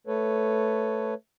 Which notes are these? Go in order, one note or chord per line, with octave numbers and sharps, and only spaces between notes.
A3 A4 B4 C#5